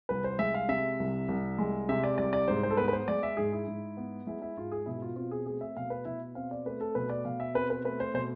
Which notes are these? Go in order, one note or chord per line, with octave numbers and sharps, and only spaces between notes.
C2 B4
C5
G#3 E5
F5
C3 E5
C2
C2
G#3
C3 E5
D5
C2 D5
D5
G#2 C5
C5
A4
B3 B4
B4
C5
G#3 D5
E5
G#2 G#4
E4
G#2
B3
G#3 E4
E4
G#2 F4
G#4
B2 E4
F4
C4 F4
G#4
A3 G#4
E5
B2 F5
B4
B2 E4
C4 F5
D5
A3 B4
A4
B2 B4
D5
B2 F5
E5
C4 B4
B4
A3 B4
C5
B2 C5